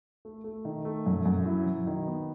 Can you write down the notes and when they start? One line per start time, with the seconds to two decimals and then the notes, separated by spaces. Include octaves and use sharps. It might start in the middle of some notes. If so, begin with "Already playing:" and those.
0.25 A3
0.44 A3
0.65 D#3
0.85 A3
1.06 F#2
1.25 F#2
1.46 E4
1.66 F#3
1.87 D#3
2.07 B3